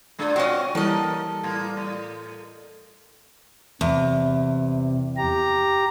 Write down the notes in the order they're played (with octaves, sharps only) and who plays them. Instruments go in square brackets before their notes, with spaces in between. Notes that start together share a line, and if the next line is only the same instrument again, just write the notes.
[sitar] A#2 G#3 D4
[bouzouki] C4 C#4 [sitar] F4 F#4 D#5 [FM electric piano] D5 F#5
[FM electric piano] E3 G3 [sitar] A#3 A#4 [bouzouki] A4 D#5
[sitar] A2 A#3
A2
[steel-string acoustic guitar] E2 [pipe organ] C3
[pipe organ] G4 A#5